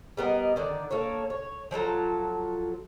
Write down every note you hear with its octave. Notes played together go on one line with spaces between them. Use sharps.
G3 B3 A#4 D#5
D3 D#3 D5
A#3 A4 C#5
C#5
F3 F#3 A4 A#5